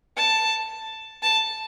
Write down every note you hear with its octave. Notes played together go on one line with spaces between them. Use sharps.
A5
A5